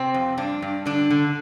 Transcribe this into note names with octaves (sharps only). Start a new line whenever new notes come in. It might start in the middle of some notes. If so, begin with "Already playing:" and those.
Already playing: C3 C4
F2
G2 D4
G2
D3 D4
D3